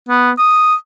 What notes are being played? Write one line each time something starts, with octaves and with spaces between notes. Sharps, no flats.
B3
D#6